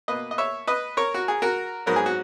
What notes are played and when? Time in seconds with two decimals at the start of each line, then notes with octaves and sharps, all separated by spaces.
0.08 B2 A#3 B4 D#5
0.31 D#5
0.38 C#5 E5
0.67 B4 D#5
0.97 A#4 C#5
1.14 F#4
1.28 G#4
1.42 F#4 A#4
1.86 G#2 F#3 B3 A#4
1.96 G#4
2.06 F#4